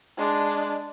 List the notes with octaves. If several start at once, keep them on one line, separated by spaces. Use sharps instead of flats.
G#3 D4